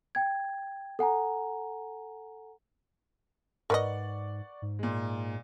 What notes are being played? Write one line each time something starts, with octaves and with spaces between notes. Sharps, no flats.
G5 G#6
A4 F#5 G#5 A#5
G#2 A#4 B4 D5 D#5 F#5 C#6
G#2
A#2 G#3